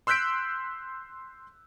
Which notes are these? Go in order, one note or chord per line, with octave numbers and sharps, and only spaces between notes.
C6 E6 F#6 G6 B6 D7